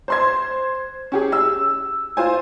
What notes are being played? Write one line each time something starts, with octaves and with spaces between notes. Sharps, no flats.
C5 C6 G#6
C#4 G4 G#4
E6
F4 C5 G#5